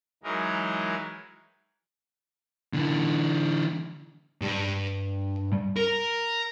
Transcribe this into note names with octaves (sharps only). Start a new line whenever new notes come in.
E3 F#3 G#3 D#4 A#4
D3 E3
G2
A#4